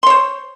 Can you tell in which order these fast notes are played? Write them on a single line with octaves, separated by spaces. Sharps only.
C6 C#5 C5